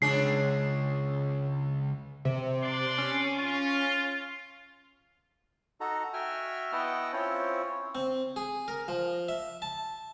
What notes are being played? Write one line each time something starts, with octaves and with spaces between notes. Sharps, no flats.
C#2 C#4 D4 G#4 C7
C3
D4 D5 C6
C#4
F4
D#4 F#4 A4 A#5
F#4 E5 G5 G#5 F6
B3 E4 D#5 F#5 G5 A5
C4 C#4 E4 F4 C5 C#5
C4
G#4
A#4
F3
E5
A5